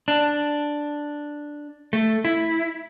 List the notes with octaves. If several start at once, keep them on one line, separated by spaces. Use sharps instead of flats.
D4
A3
E4